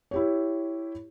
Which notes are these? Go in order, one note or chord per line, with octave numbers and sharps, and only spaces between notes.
E4 G4 C#5